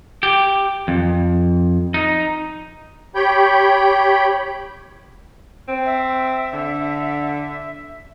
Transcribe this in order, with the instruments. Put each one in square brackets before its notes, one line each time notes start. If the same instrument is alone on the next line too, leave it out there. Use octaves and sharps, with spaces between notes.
[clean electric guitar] G4
F2
D#4
[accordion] G4 C#5 G5 B5 G6
[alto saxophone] C4
[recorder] E5
[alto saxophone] D3